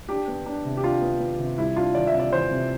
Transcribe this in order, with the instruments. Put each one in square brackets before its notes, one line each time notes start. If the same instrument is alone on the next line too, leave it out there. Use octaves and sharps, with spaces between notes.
[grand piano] D4 G4
B3
D4
C3
G4
D4 F4
B3
B3
C3
G3 E4
D4 F4
E3 D5
E5
C3
D5
E3 C5
C3